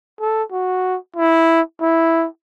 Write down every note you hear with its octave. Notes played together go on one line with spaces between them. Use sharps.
A4
F#4
E4
E4